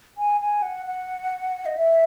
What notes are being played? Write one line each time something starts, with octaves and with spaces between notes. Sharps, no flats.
G#5
G#5
F#5
F#5
D#5
E5